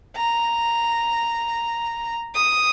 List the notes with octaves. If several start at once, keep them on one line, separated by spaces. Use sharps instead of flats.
A#5
D#6